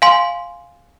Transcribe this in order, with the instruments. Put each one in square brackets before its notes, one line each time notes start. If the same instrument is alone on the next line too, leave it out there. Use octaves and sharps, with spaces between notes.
[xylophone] F5 G#5 C6